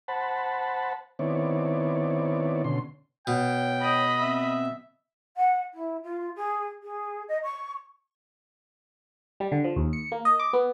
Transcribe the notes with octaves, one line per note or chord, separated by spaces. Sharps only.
C5 F#5 A5 B5
D#3 B3 C4 E4 C#5 D5
B2 D3 C#4 C6
B2 C#5 G5
D#5 B5
C4 E5
F#5
E4
F4
G#4
G#4
D#5
C#6
G3
D3
F3
D#2
C#7
A#3
D#5
D6
B3